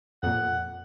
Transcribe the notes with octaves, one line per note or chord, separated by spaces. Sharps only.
F2 A#2 F#5